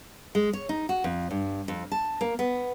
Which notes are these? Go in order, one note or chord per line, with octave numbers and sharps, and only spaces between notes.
G#3
C#5
D#4
F#4
F2
G2
F2
A5
A#3
B3